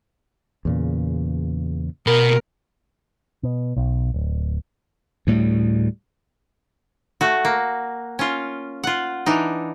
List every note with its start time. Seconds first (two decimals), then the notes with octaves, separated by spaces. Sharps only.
0.65 E2 A#2 C#3
2.07 B2 A#4 B5
3.43 B2
3.76 B1
4.14 D1
5.27 D2 A2 G3
7.21 A3 F#4
7.45 A#3
8.19 C#4 F4
8.84 F4 F#5
9.26 E3 D4 D#4